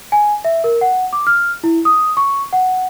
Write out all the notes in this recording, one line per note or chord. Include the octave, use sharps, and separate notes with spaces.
G#5
E5
A#4
F#5
D6
F6
E4
D#6
C#6
F#5